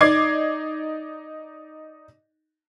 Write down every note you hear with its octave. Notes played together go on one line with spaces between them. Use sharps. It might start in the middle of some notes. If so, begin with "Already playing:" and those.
D#4 D5 D6 G#6 C7